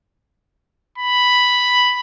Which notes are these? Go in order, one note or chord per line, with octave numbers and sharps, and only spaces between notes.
B5